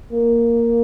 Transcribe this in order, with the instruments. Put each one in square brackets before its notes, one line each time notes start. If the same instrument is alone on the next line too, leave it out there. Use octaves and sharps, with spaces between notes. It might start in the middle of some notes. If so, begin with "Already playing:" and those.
[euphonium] A#3